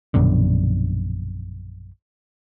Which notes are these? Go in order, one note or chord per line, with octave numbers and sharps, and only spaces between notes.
A#1 F#2 B2 D3